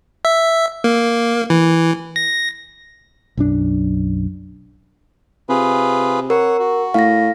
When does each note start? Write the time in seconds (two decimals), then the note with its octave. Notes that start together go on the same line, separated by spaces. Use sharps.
0.25 E5
0.84 A#3
1.50 E3
2.16 A#6
3.37 B1 F#2 D4
5.49 C3 F4 G#4 B4
6.30 A#4 C#5 F#5
6.59 F#4
6.94 A2 F5 A#6